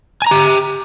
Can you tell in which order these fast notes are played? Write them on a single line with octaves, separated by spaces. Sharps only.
G#5 A#5 G4